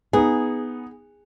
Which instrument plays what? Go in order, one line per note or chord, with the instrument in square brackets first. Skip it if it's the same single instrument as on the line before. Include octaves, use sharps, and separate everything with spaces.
[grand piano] B3 D#4 [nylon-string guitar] G#4